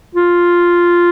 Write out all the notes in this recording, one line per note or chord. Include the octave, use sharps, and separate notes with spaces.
F4